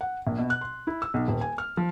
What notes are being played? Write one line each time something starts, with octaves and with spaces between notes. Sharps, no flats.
F#5
A#1
B2
F#6
C6
E4
E6
B1
D#1
G#5
F6
F3